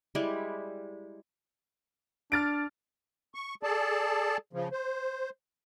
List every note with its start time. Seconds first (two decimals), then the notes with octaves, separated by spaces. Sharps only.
0.15 G3 G#3 E4 G4
2.32 D4 F6 A6 D7
3.35 C#6
3.63 G#4 A4 D5 A5
4.53 C#3 F3
4.72 C5